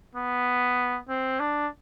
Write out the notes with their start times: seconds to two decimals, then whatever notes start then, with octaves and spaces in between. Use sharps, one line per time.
0.15 B3
1.09 C4
1.39 D4